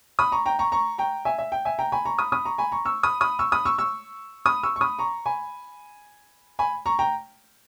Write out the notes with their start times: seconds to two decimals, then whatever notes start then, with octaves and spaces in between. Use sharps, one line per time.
0.19 B5 D#6
0.32 A#5 C#6
0.46 G5 A#5
0.59 A#5 C#6
0.72 A#5 C#6
0.98 G5 A#5
1.25 E5 G#5
1.39 E5
1.52 G5
1.65 E5 G#5
1.79 G5 A#5
1.92 G#5 B5
2.05 A#5 C#6
2.18 B5 D#6
2.32 B5 D#6
2.45 A#5 C#6
2.58 G#5 B5
2.72 A#5 C#6
2.85 C#6 E6
3.03 B5 D#6
3.21 B5 D#6
3.39 C#6 E6
3.52 B5 D#6
3.65 C#6 E6
3.78 C#6 E6
4.46 B5 D#6
4.63 C#6 E6
4.76 C#6
4.81 B5 D#6
4.99 A#5 C#6
5.26 G#5 B5
6.59 G#5 B5
6.86 A#5 C#6
6.99 G5 A#5